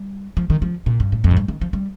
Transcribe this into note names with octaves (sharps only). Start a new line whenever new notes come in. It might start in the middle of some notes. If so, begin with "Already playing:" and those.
Already playing: G3
F3
D#3
F3
A#2
G2
A2
F2
A2
G2
D#3
F3
G3